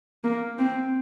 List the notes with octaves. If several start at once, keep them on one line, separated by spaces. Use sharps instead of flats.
A#3
C4